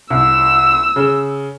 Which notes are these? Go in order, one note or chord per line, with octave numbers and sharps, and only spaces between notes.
C2 E6
C#3